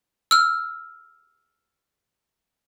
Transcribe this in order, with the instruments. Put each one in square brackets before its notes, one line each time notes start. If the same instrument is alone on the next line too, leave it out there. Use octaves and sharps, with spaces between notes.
[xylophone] E6 F6